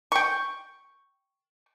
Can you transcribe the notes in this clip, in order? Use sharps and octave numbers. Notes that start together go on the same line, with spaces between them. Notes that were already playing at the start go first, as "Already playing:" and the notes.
G5 C#6